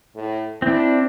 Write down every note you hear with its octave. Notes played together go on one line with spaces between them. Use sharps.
A2
C4 D4 E4